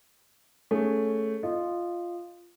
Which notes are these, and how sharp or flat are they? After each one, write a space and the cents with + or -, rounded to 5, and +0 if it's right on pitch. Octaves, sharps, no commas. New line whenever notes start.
A3 +0 C#4 +0 G#4 +0
F4 -5 D#5 -20